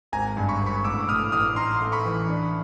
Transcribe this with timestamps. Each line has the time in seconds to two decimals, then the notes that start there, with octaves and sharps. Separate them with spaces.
0.12 G#1 G#5 A#5
0.37 G2
0.49 B5 C#6
0.61 G#1
0.66 B5 C#6
0.84 A1 D6 E6
1.09 A2 D#6 F6
1.32 A1 D#6 F6
1.56 D#4 A#5 C6
1.81 A3
1.92 B5 C#6
2.05 E3
2.29 D4